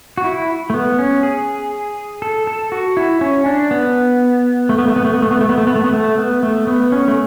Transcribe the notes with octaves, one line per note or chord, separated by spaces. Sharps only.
F#4
E4
A3
B3
C#4
G#4
A4
A4
F#4
E4
C#4
D4
B3
A3
B3
A3
B3
A3
B3
A3
B3
A3
B3
A3
B3
A3
B3
A3
B3
A3
B3
C#4
A3